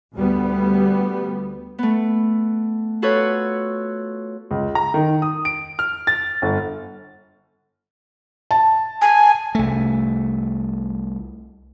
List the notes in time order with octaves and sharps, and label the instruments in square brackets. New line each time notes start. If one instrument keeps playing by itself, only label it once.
[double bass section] D2 G3 B3
[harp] A3 B3
F4 F#4 A4 B4 C#5
[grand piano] C#2
A#5
D#3
D#6
D7
F6
A6
G1
[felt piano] A5
[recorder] G#5
[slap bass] C2 A3